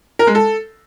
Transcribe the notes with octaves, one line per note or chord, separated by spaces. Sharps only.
A#4
G#3
A4